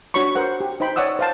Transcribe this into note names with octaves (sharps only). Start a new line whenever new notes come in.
D4 F#4 C#5 B5 C#6
A#4 C5 F#5
G4
D#4 C5 G5 B5
C#5 D5 F#5 D#6 E6
C5 F5 A5